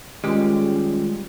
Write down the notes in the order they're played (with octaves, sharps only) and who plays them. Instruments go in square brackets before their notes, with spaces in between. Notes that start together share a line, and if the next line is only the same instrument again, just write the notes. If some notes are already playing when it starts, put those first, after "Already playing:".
[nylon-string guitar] D#3 F4 G#5 [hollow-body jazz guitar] G3 G4 [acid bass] G#3 [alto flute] C#4